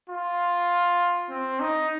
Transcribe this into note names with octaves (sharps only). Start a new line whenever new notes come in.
F4
C4
D#4